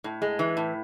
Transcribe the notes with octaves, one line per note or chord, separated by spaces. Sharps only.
A2
G#3
E3
A2